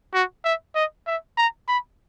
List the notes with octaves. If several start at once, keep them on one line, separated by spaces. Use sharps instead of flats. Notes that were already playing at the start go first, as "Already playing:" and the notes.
F#4
E5
D#5
E5
A#5
B5